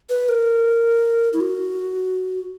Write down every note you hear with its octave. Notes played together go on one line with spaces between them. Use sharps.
B4
A#4
E4
F#4